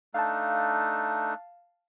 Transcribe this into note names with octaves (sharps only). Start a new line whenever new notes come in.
A3 D4 D#4 F5 A5